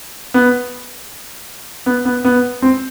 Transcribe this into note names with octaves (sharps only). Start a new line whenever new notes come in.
B3
B3
B3
B3
C4